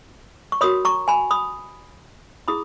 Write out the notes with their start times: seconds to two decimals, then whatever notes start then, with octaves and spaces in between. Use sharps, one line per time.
0.52 C#6
0.61 F#4 A#4 C#5 B5 D#6
0.85 A#5 C#6
1.08 G#5 B5
1.31 B5 D#6
2.48 E4 G#4 B5 D#6